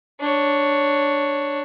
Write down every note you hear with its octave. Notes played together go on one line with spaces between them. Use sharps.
D4 C#5